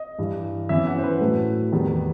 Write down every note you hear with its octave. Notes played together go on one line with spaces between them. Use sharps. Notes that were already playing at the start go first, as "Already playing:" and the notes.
Already playing: D#5
G2 E3 G3
F#2 E3 B3 E5
F#5
C5
B4
A2 F#3 A3
E2 D#3 G3 B3